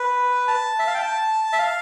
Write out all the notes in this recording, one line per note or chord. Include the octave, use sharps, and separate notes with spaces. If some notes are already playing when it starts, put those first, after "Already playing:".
Already playing: B4
A5
E5
F5
G5
A5
E5
F5